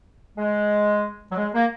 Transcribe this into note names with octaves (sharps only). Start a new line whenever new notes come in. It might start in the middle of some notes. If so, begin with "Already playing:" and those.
G#3
F#3
G#3
A#3